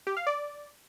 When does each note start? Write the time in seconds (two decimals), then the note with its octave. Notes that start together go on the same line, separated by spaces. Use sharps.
0.07 G4
0.17 F5
0.27 D5